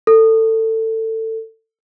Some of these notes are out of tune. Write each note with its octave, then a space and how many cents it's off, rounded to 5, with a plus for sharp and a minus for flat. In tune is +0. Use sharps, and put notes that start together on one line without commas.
A4 +20